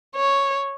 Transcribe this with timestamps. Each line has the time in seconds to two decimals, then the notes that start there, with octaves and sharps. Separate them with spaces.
0.16 C#5